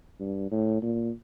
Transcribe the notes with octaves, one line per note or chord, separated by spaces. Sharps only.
G2
A2
A#2